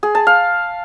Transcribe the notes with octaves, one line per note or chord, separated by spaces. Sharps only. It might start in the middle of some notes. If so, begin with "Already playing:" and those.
G#4
A5
F5